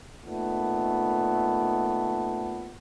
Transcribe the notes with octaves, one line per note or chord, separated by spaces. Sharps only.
A#2 D#3 A3 B3